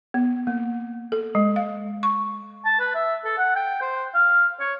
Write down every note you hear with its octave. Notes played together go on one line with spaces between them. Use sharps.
B3
A#3
A4
G#3
F5
C#6
A5
B4
E5
A4
F#5
G5
C5
F5
C#5